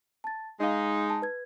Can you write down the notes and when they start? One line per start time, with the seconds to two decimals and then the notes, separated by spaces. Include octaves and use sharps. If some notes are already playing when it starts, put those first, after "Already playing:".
0.24 A5 A6
0.60 G#3 D#4 D#5 F5
1.10 A5
1.22 B4 G#6